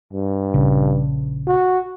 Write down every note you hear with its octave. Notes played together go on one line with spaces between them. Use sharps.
G2
A#1 C#3
F#4